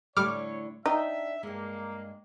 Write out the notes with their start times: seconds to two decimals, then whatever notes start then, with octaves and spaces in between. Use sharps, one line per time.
0.17 A2 D3 G3 A3 C#5 D6 F6
0.86 D4 D#4 E5 G5
1.43 G2 G#3 A#3